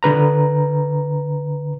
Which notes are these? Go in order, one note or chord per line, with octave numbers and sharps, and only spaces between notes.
D3 B4 A#5